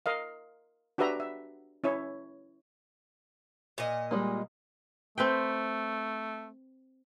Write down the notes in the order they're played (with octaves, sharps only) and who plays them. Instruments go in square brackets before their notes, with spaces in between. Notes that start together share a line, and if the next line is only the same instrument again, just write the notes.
[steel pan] A#4 D#5 F5
D4 F#4 G4 B4 E5 A#5
E5
C#4 E4 C#5
[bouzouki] A#2 D#5
[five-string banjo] G3 G#3 A#3
[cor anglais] A3 [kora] C4 B4 G5